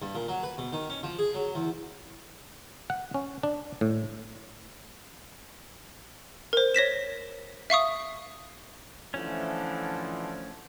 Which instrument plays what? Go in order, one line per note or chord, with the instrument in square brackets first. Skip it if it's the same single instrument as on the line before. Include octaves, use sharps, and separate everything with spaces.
[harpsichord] G2
A#2
F#3
B4
B2
D#3
C#4
F3
G#4
F#3
E2
[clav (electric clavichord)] F#5
C#4
D4
A2
[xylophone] A#4 C5
C#5 A#6 B6 E7
E5 F5 C#6 D#6
[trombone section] D3 E3 F3 [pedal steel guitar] A3 C#4